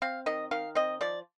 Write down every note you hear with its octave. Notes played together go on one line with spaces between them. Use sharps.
C4 F5
D#3 D#5
D#3 F5
C4 D#5
F3 D5